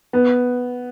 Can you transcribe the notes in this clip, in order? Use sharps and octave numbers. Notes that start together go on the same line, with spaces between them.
B3